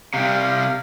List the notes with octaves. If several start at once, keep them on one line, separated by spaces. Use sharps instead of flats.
C3 G3 F5